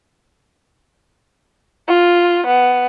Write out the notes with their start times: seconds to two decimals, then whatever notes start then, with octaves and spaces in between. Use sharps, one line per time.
1.88 F4
2.47 B3